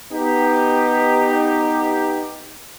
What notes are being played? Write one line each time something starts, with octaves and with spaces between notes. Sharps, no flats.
B3 D#4 G4